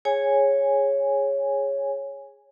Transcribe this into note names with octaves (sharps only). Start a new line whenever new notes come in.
G#4 C#5 G#5